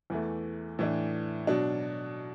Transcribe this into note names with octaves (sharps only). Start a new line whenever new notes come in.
E2 E3 A3
A2 E3 D4
B2 F#3 D4